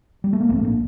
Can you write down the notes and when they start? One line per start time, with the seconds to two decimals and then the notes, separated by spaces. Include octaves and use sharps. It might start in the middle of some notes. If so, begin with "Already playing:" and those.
0.24 G3
0.33 A3
0.41 A#3
0.49 A#1 A2 A3 C4
0.64 A#3 D4